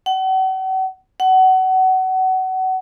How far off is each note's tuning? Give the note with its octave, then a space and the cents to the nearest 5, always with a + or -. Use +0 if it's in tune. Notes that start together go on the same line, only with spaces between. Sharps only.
F#5 +40
F#5 +25